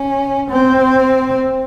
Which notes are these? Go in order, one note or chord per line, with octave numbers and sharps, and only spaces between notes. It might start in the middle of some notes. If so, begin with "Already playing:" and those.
Already playing: C#4
C4